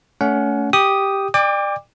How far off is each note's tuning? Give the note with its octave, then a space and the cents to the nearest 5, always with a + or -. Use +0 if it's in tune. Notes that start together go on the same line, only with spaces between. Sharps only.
A3 +0 C#4 +30 F#5 +0
G4 +0 G5 +0 D#6 +0
D5 +30 G5 +35 D6 +0